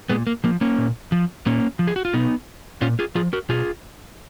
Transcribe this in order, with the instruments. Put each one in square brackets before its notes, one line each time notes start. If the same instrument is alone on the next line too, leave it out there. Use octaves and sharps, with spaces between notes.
[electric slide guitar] A#2 G#3 B3
A#3
F3 A#3
A#3 C#4
A#2
F3
A#2 A#3 C#4
F3
G#4
F#4
F4
B2 B3 D#4
A#2 C#4 F4
F4 G#4
F3 F4 G#4
F#4 A#4
B2 F4 G#4